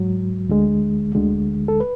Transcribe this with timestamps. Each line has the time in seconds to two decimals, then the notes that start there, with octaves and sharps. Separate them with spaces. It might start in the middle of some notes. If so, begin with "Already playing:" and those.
Already playing: G#2 F#3
0.49 D2 D3 G#3
1.15 D2 D3 G#3
1.68 A4
1.80 B4